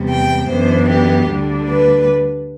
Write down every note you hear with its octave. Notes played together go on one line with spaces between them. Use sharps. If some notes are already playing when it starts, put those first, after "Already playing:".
Already playing: E2 C3 G3
G5
F#2 E3 B3 D4 C5
G4
D2 D3 G3 D4
B4